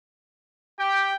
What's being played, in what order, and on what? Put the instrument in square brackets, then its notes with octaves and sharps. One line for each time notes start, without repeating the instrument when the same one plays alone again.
[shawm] G4 [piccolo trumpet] G5